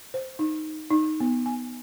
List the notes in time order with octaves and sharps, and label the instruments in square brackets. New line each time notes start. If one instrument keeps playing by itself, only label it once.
[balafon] C5
D#4
D#4
B3
G#5